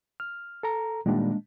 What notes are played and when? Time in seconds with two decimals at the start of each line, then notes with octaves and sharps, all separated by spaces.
0.20 F6
0.63 A4 A#5
1.06 A#2 D#3 G3 G#3 A#3 D4